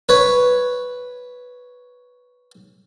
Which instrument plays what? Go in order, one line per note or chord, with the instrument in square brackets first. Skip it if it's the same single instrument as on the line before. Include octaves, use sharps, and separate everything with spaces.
[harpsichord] B4 C#5